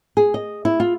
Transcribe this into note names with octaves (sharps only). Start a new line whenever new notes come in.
G#4
D#5
E4
F4